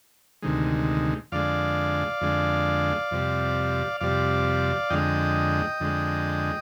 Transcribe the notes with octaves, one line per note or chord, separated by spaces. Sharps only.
D2 C3 D#3 G#3
F2 D3 G#3 D5 F5
F2 D3 G#3
F2 C3 G3
F2 C3 G3 D5 F5
F2 D3 G#3 D#5 G5
F2 D3 G#3